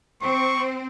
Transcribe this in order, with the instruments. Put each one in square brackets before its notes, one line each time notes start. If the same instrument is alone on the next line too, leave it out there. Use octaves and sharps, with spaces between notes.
[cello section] C4 [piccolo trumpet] C#6